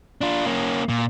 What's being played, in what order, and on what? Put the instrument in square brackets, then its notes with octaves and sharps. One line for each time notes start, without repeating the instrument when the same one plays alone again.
[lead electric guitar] D4 F4
A#3 C#4
A#2